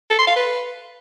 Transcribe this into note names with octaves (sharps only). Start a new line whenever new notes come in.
A4
C6
F5
B4